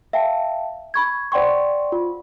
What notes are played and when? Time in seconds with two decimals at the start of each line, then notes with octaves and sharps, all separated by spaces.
0.13 E5 F5 G5 A5
0.94 B5 C#6 G#6
1.32 C5 D5 F#5 G5 C6 C#6
1.92 F4